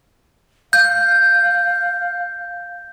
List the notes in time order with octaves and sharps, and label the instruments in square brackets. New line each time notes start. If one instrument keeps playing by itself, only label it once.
[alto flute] F5 [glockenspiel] G6